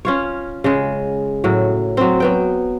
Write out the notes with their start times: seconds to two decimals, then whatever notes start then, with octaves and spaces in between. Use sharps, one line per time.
0.05 C#4 F4 C#5
0.64 C#3 G#3
1.44 A2 F#3
1.97 F#3 C4
2.20 F#3 B3 G5